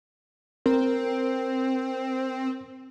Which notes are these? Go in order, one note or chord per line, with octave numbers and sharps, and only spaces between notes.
C4 A#4